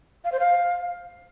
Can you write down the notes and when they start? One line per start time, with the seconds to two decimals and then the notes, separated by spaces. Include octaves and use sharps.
0.24 F5
0.32 C5
0.40 F5